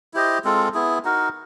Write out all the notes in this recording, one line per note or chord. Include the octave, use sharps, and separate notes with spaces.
E4 G4 C5 D#5
G#3 C4 F4 A4
B3 E4 G#4
D#4 F#4 A#4